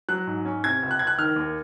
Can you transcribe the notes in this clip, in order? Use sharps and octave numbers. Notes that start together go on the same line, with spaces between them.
F#3 F#6
G#2
C#4
C3 G#6
C#2
F#6
C#2 G#6
F#6
D#3 F6
D#2